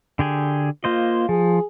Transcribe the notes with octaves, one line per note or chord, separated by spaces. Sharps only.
D3 G4 G#4
A#3 F4 C5 D#5
F3 G#4